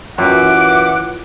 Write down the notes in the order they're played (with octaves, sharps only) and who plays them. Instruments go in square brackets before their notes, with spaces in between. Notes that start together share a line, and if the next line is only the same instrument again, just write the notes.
[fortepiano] F#2 [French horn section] E3 F4 [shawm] F#5 [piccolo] D6